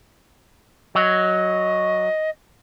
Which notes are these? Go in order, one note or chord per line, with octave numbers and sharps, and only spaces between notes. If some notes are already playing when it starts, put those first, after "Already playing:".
F#3 D#5